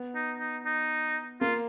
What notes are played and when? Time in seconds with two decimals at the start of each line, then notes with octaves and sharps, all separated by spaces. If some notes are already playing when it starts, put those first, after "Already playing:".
Already playing: B3
0.15 D#4
0.40 D#4
0.66 D#4
1.41 A#3 F4